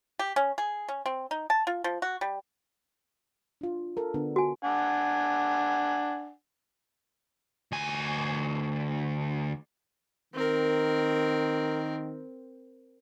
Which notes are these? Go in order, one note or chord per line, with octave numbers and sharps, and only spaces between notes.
G4
C#4
G#4
C#4
C4
D#4
A5
F4
F3
F#4
G3
D4 F4
A4 A#4
D3 B3 D4
F#4 G#5
D4 F#5 G#5
D2 G#5
D#3 C4 A#4